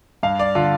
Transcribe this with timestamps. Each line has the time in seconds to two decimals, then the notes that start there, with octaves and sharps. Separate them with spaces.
0.23 G2 F5
0.39 D5
0.55 D3 F4